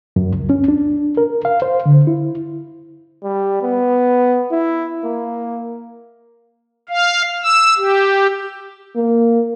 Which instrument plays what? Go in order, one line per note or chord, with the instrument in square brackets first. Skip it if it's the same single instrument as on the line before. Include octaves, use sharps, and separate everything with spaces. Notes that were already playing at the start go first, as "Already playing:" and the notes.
[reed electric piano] F#2
C#2
C#4
D4
A#4
F5
C5
D3
E4
[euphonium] G3
B3
E4
A#3
[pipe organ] F5
E6
G4
[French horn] A#3